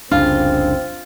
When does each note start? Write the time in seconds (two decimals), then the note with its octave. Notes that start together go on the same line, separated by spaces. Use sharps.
0.11 F1 C2 C#3 C4 D4 F4